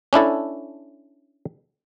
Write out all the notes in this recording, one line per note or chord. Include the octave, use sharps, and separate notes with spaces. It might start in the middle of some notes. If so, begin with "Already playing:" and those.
C#4 D4 E4 A4